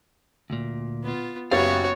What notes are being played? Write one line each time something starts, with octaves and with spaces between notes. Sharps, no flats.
D2 A#2
B3 F4
F#1 B3 F#4 G4 C#5 F5 A6